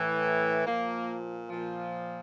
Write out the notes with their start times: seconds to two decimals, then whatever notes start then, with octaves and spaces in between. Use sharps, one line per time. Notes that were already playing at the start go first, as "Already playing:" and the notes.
Already playing: A2 E3
0.66 A#2 F3 A#3
1.50 A#2 F3